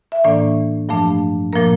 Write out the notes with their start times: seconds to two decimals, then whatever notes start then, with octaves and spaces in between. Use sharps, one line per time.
0.12 E5
0.24 A2 E3 A#3 D4 D5
0.89 G2 F3 A3 D4
1.53 A#2 F3 A#3 A#4